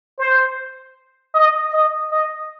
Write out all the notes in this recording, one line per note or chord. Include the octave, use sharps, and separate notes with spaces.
C5
D#5
D#5
D#5